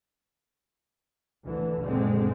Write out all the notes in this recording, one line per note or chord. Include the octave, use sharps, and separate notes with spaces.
D2 D3 E3
F#1 A#2 D3 G#3 C4